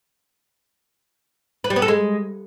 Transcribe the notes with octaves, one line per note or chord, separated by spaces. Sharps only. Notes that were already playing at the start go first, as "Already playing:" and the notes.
B4
G3
B3
A4
G#3